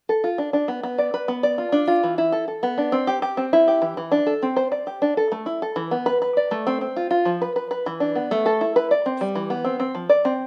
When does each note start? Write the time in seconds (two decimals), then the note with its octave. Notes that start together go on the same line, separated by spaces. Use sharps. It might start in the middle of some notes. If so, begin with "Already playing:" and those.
0.09 A4
0.24 F4
0.38 D4
0.53 D4
0.68 B3
0.83 B3
0.98 D5
1.14 B4
1.28 B3
1.43 D5
1.58 F4
1.72 D4
1.88 F4
2.03 E3
2.18 E4
2.32 A4
2.48 A4
2.63 B3
2.78 D4
2.92 C4
3.07 G4
3.22 G4
3.37 C4
3.53 E4
3.68 G4
3.82 E3
3.97 E3
4.12 D4
4.27 A4
4.43 C4
4.56 C5
4.72 D5
4.87 G4
5.02 D4
5.17 A4
5.32 A3
5.46 E4
5.62 A4
5.76 E3
5.91 B3
6.06 B4
6.22 B4
6.37 D5
6.51 A3
6.67 C4
6.81 C4
6.96 F4
7.11 F4
7.25 F3
7.42 B4
7.56 B4
7.71 B4
7.86 E3
8.00 D4
8.15 B3
8.31 A3
8.46 A4
8.61 E4
8.76 B4
8.91 D5
9.06 C4
9.21 G3
9.35 E3
9.50 B3
9.65 C4
9.80 C4
9.95 F3
10.09 D5
10.25 C4